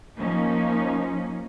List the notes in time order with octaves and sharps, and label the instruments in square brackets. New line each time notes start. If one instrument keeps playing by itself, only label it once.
[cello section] F3 A#3 C#4 D#4